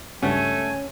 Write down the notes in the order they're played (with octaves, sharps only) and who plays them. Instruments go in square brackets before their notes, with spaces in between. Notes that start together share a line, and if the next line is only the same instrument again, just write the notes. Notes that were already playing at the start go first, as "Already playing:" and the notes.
[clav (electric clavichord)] C#2 G2 F#4 [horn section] A3 [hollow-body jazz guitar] C#4 [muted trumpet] G#5